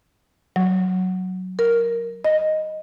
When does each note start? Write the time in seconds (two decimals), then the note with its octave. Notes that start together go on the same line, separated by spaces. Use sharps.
0.56 F#3
1.59 A#4
2.25 D#5